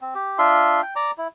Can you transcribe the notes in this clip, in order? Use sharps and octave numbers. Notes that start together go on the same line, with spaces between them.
C4
G4
D4 F4 E5 C6
G5
D5 A#5 D6
E4